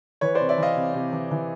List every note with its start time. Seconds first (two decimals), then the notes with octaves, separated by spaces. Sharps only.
0.21 E3 B4 C#5
0.35 C5 D5
0.40 C3
0.49 D5 E5
0.58 E3 D#5 F5
0.76 C3
0.94 C3
1.13 E3
1.31 E3